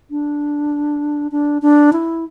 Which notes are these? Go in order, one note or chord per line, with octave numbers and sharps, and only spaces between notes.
D4
D4
D4
E4